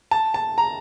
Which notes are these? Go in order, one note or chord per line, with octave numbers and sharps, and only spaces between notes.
A5
A5
A#5